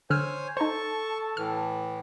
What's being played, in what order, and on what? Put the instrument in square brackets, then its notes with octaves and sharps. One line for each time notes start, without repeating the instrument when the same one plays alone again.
[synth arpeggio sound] D3 E6 F6 [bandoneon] C5 C#5 G#5
[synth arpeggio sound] D#4 C5 [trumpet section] A4 A5 [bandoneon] C#6
[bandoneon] A2 E3 [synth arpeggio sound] F6